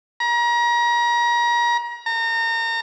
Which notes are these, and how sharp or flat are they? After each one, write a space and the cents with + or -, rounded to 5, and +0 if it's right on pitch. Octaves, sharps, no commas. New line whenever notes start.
A#5 +35
A#5 -30